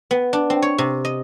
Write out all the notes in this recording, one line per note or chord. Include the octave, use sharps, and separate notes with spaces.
B3
D4
C4
C#5
C3
D#5